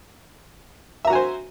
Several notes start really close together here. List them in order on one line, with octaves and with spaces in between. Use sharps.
E5 A#5 F#4 G#5 C5